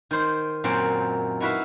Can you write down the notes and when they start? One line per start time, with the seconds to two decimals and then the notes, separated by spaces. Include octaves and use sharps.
0.11 D#3 C5
0.64 F#2 A#2 C4 C5 G5
1.40 D#4 E4 F#4 B4 E5 F5